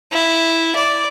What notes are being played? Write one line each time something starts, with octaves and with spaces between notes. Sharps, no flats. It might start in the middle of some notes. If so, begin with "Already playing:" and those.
E4
D5